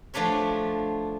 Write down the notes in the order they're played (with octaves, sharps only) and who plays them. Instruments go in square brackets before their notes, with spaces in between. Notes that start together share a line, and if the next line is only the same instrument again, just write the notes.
[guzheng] D3 F3 A3 D4 B4 C#5